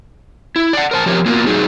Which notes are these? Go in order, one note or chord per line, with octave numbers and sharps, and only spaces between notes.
E4
D5 F#5
A#4 C5 A5
F3 G4 A#4 C#5
A#3 B3 F4 F#4 A#4
F#3 A3 D#4 G#4